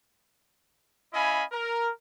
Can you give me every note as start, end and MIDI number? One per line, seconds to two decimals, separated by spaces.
1.14 1.43 61
1.14 1.43 64
1.14 1.43 75
1.14 1.43 77
1.14 1.43 80
1.14 1.43 83
1.52 1.90 70